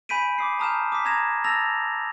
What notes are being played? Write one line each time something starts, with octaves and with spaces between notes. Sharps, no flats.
G#5 B5 G6 B6 D7 D#7
D6 D#6 C7
A5 A#5 D#6 F6 G6 E7
D6 D#6 B6
A#5 D#6 G#6 A#6 E7
A5 E6 A6 A#6 F7